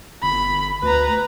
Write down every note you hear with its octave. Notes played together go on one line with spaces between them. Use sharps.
G1 B5
D2 B4 A#5